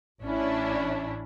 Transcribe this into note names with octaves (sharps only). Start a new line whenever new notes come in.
A1 C#4 D4 E4